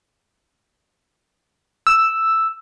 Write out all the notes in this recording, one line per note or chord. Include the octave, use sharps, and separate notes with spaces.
E6